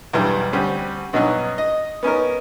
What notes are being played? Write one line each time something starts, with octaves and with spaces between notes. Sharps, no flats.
B1 E2 G2 E3 G3
D2 G3 C4 C#4
G2 B2 F#3 C#4 D#4
D#5
B3 C#4 D#4 A#4